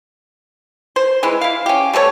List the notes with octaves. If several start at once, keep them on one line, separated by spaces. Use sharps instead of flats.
C5
E3 G#3 E4
E4 F5
C#4 G4
G3 A3 A4 C#5